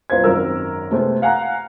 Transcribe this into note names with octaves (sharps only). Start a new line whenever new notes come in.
C2 F4 B4 C5 G#6
G#1 F#2 C4 A#4 E6
C3 G#3 A3 B3 C4
F5 F#5 G#5 A#5 F#6